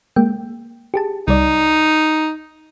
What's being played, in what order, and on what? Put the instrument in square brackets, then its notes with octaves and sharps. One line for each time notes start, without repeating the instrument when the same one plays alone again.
[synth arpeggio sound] G#3 A#3 G5
G4 G#4 A5
[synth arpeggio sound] C2 G3 D5 [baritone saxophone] D#4